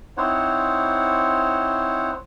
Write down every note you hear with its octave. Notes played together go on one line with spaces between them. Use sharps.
C4 D#4 E4 C5 C#5 F#5